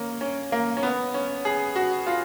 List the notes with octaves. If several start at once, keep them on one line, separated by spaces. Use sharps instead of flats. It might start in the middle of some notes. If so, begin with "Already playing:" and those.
Already playing: A#3 C#4
C#4
A#3
C#4
B3
C#4
G#4
F#4
F4